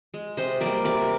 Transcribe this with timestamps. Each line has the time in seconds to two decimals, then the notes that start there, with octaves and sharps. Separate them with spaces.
0.14 G#3
0.37 C3 C5 D#5
0.61 G3 A#3 A#4 D5
0.84 C3 A#4 D5